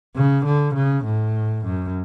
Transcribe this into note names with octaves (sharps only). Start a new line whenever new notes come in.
C#3
D3
C#3
A2
F#2